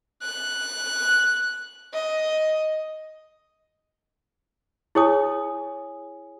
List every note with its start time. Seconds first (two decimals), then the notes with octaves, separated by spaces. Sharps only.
0.23 F#6
1.94 D#5
4.95 E4 G#4 C#5 G#5 D#6